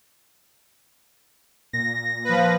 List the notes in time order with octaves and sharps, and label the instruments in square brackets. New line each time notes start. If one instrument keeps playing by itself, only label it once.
[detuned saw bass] A#2 [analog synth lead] A#6
[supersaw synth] F3 B4